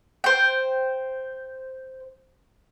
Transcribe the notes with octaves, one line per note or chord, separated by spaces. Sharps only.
C5 G5